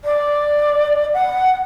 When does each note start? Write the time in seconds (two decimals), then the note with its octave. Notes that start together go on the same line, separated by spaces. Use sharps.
0.04 D5
1.14 F#5